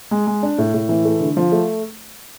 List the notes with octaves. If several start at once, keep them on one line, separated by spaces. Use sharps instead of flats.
G#3
G#3
D4
A2
A2
E3
A3
D3
F3
A3